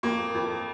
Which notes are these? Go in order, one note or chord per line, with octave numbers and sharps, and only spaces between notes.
F2 A#3
F2